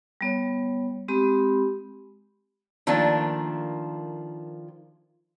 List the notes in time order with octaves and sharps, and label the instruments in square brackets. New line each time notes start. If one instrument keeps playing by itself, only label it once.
[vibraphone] G3 B3 C#5
G#3 C4 G4 B5
[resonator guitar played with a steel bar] D#3 F3 A3 A#3 D4 F4